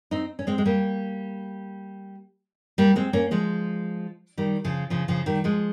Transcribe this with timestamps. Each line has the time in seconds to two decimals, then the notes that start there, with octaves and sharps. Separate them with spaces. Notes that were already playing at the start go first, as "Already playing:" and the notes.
0.11 C4 D#4
0.39 C#4
0.47 G#3 C4
0.58 G#3
0.65 G3 A#3
2.78 G3 A#3
2.96 G#3 C4
3.13 A#3 C#4
3.31 F3 G#3
4.38 D#3 G3
4.64 C#3 F3
4.90 C#3 F3
5.08 C#3 F3
5.26 D#3 G3
5.44 F3 G#3